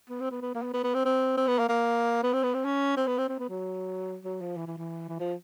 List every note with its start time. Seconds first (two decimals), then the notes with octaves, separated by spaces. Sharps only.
0.09 B3
0.20 C4
0.31 B3
0.42 B3
0.55 A#3
0.63 B3
0.73 B3
0.84 B3
0.94 C4
1.05 C4
1.37 C4
1.48 B3
1.59 A#3
1.69 A#3
2.23 B3
2.33 C4
2.43 B3
2.54 C4
2.65 C#4
2.97 C4
3.07 B3
3.18 C4
3.29 C4
3.39 B3
3.50 F#3
4.24 F#3
4.41 F3
4.57 E3
4.67 E3
4.78 E3
5.09 E3
5.20 F3